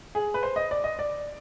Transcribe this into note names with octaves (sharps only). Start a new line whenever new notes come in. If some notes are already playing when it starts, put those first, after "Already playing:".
G#4
B4
C5
D#5
D5
D#5
D5